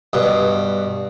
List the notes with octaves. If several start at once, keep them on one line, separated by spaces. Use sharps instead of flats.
G2 B2 C6